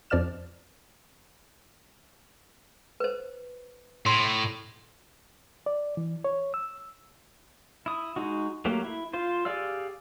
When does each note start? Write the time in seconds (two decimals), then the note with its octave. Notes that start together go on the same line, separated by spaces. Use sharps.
0.10 F2 F3 D5 D#5 F6 E7
3.00 B4 C5
4.06 A2 C6
5.66 D5
5.97 E3
6.24 C#5
6.54 E6
7.86 E4 D#6
8.16 G#3 D#4 F#4
8.65 F#3 A3 A#3 G4
8.84 E4
9.13 F4 C5
9.45 G4 G#4 D5 F5 E6